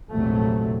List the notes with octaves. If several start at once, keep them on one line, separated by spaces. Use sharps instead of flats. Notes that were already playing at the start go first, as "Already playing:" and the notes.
A#1 E2 G#2 C3 F#3 A3